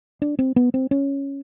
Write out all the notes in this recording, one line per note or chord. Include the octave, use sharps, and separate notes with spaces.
D4
C4
B3
C4
C#4